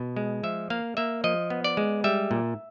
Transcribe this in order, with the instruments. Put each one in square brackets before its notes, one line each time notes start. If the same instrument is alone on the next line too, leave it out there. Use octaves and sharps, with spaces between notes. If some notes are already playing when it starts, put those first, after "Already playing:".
Already playing: [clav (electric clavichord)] B2
G#3
F3 E5
A#3 F5
A#3 E5
F3 D#5
B3
D5
G#3
G3 E5
A#2